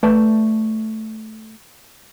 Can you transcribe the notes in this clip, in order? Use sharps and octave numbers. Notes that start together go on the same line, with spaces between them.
A3 B4 D5 A5